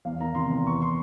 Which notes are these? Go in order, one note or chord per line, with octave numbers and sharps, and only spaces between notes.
E2 F5
D#3 A#5
C3 C6
E2
E3 C#6
C6